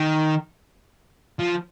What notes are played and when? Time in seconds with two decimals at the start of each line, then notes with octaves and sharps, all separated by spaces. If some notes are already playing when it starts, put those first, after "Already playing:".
Already playing: D#3
1.40 F3